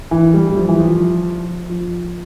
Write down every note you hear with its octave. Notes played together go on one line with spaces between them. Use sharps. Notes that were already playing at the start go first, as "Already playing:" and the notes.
E3
G3
G3
F3
E3
F3
F3